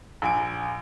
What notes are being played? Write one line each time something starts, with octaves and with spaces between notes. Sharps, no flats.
A#1 G#5 D7